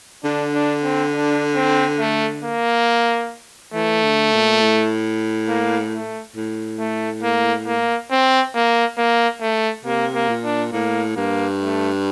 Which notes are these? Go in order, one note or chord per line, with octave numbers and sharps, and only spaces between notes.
D3 D4
D4
C4
D4
C4
A3
A#3
E3 A3
D3
A#2
A2
A#3
A3
A2
A3
A#3
A#3
C4
A#3
A#3
A3
C3 A#3
A#3
A#2
D4
A2 A#3
G2 A#3
A3